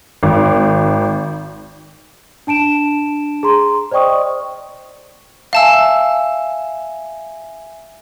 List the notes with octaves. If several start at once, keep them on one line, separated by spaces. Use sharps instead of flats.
G#1
D4 A5 D7 E7
G#4 A#5 C6
C5 D5 D#5 G5 C#6 D#6
E5 F5 G#5 A5 E6